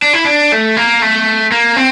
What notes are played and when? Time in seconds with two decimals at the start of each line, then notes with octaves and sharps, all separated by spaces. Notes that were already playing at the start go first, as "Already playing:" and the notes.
0.02 D4
0.13 E4
0.25 D4
0.52 A3
0.77 A#3
1.02 A3
1.52 A#3
1.76 C4